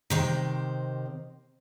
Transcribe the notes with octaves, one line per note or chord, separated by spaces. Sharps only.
C3 D#3 C5